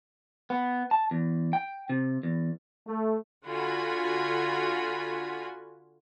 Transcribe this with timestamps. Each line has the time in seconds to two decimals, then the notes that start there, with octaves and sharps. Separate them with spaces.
0.50 B3
0.91 A5
1.11 E2
1.53 G5
1.90 C3
2.23 E2
2.87 A3
3.46 D3 F4 F#4 F#5 G#5 B5